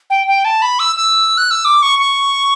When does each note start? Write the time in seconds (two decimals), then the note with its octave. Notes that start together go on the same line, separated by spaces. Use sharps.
0.10 G5
0.27 G5
0.45 A5
0.62 B5
0.79 E6
0.96 E6
1.37 F#6
1.51 E6
1.65 D6
1.82 C#6
1.99 C#6